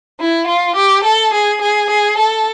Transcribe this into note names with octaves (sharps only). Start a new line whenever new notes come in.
E4
F4
G4
A4
G#4
G#4
G#4
A4